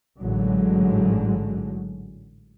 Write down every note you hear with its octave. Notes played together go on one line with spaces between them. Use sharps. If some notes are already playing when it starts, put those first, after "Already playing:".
A1 G#2 D3 F#3 G#3